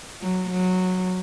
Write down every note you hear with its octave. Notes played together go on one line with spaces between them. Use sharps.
F#3
F#3